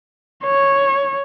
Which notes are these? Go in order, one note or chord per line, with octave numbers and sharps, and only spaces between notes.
C#5